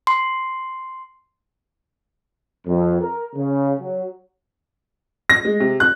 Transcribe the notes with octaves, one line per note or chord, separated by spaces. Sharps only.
C6
F2
A#4
C#3
F#3
A#6
G#3
C3
F#6